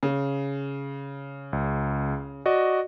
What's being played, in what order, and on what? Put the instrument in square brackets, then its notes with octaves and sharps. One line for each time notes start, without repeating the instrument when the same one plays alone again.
[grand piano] C#3
[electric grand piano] C#2
F#4 D5 D#5